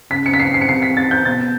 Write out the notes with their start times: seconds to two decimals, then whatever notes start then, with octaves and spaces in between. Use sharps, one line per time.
0.11 C#3 B6
0.26 C#7
0.34 B6
0.40 C7
0.54 C7
0.61 C#7
0.69 C3 C7
0.82 B6
0.97 A6
1.11 G6
1.25 B2 A6